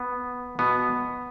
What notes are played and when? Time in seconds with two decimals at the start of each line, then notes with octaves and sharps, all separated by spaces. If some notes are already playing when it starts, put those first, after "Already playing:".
Already playing: B3
0.59 B2 B3